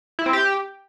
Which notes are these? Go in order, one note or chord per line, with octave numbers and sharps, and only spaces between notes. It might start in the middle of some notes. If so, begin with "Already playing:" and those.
E4
C4
G4